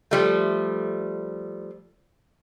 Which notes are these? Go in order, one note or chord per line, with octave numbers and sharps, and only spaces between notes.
F3 G3 A3